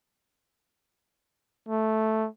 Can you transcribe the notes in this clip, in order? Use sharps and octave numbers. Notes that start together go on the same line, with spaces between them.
A3